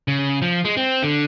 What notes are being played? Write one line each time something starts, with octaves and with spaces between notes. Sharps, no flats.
C#3
F3
G#3
C4
D3